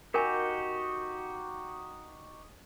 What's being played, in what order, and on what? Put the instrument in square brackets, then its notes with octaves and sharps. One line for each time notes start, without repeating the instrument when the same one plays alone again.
[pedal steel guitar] D#4 F#4 G4 [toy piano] A#4 G#5